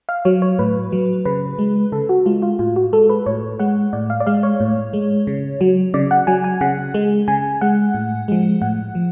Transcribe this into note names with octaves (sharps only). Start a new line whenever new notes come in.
F5
F#3 C#5
C#5
A2 B4
F#3
C#3 B4
G#3
C#3 A4
F#4
G#3 F4
F4
A2 F4
F#4
G#3 A4
B4
A2 C#5
G#3 F#5
A2 D5
F5
D5
G#3 F5
C#5
A2
G#3
C#3
F#3
C#3 D5
F#5
F#3 G#5
G#5
C#3 F#5
G#3
C#3 G#5
G#3 F#5
A2
F3 G#3
A2 F#5
F3